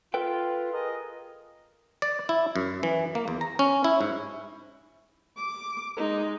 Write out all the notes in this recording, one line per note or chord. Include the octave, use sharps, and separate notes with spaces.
F4 A4 B4 G5
G#4 A#4 D#5
D5
E4
F#2
E3
A#3
E2
A#5
C#4
E4
G#2
D6
G#3 D#4